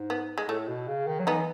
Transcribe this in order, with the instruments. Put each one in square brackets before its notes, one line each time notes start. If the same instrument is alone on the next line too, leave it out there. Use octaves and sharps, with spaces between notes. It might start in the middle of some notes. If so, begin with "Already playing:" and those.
Already playing: [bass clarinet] G#2
[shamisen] B3
G#3
[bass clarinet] A2 [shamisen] A3
[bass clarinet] B2
C#3
D#3
F#3
[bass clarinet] E3 [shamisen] B3 D#4